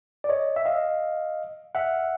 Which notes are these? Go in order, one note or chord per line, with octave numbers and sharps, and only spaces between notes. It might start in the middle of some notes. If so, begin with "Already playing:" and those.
D5
C#5 D#5
E5
D#5 F5
E5 F#5